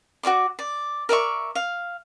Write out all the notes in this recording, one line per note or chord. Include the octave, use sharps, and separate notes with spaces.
F#4 C#5 D5 D6
D5
A#4 D5 E5 C#6
F5